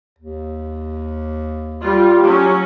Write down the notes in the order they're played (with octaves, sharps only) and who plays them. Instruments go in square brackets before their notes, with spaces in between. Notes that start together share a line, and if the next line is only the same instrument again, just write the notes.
[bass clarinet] D#2
[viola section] G3 F4
[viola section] F#3 C#4 [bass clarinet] G4